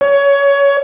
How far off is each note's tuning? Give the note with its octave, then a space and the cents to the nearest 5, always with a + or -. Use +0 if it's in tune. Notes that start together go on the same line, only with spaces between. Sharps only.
C#5 +20